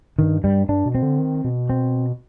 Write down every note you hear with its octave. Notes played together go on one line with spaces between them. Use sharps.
G2 D#3
G2 G3
G2 D4
B2
C4
D3
D#3
B2
C4